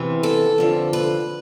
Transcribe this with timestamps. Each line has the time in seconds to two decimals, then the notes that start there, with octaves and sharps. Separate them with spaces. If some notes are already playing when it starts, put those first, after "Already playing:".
Already playing: E2 C3 E3
0.23 A4
0.58 F2 D3 F3
0.93 B4